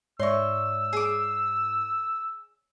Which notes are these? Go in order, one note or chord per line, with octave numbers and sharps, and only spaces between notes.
G#2 C#5 D5 E5 C6 C#6 E6
G#4 D6